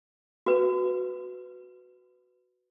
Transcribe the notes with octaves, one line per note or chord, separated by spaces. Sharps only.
F#4 B4